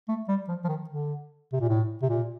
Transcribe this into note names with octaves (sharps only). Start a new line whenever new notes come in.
A3
G3
F3
F3
D#3
D3
C3
A#2
A2
C3
A#2